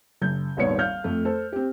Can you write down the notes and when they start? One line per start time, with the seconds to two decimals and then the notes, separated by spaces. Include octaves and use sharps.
0.21 F#1 G6
0.57 D#1 G#1 D#2 B3 C#5 C#7
0.79 F5 F6 G6
1.04 F2 A3
1.25 A4 C5
1.53 C4 G4